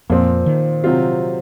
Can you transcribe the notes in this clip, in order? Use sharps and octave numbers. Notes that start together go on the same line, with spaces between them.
F2 A#2 F3 C4
D#3
C3 F#3 C4 F4